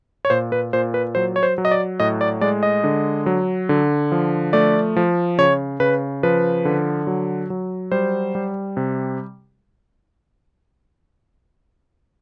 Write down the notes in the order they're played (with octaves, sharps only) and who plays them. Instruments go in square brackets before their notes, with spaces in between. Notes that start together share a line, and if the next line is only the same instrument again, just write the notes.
[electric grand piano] C#5
A#2 C5
B4
A#2 C5
B4
F#3 C5
C#5
C5
F#3
D#5
D5
A2 D#5
D5
G#3 D5
D#5
D3
F#3
D3
F3
A3 D5
F3
C#3 C#5
C#3 B4
F3 B4
D3
F#3
F#3
G3 C5
G3
C3